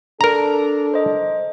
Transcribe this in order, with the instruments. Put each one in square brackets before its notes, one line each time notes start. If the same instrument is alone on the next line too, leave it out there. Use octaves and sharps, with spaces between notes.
[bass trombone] D4 [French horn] A4 [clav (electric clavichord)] A#4 A#5
[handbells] C5 D#5